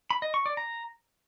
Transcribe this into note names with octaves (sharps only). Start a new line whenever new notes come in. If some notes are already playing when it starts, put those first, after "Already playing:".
B5
D#5
C#6
D5
A#5